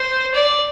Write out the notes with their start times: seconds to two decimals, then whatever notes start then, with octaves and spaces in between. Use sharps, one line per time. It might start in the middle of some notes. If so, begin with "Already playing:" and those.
Already playing: C5
0.34 D5